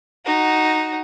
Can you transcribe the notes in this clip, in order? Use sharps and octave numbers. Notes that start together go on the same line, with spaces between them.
D#4 F#4